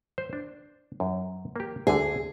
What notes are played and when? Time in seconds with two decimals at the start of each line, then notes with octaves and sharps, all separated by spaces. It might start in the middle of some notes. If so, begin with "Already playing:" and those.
0.18 C5
0.33 D4
1.00 F#2
1.56 A#3 G4
1.87 D2 D3 G#4